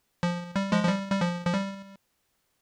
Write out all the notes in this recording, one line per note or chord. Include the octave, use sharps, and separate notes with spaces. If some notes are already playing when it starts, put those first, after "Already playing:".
F3
G3
F3 G#3
F3
G3
G3
F3
F3
G3